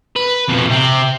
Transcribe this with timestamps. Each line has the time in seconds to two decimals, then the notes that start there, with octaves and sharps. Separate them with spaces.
0.16 B4
0.49 F2 B2
0.71 C3 C4